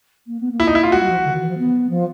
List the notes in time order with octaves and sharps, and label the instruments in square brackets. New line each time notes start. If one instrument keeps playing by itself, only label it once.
[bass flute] A#3
B3
A#3
[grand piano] E4
D#4
E4
F4
[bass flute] G#3 [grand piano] F#4
[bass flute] G3
F3
D3
D#3
E3
F3
B3
F3